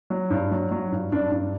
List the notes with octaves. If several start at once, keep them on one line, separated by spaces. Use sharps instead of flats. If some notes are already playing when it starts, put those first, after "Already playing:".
F#3
G2
F#3
F#3
G2
G2 D4
G2